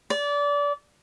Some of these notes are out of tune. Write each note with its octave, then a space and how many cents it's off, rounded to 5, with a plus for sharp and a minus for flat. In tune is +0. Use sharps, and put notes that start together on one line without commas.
D5 -25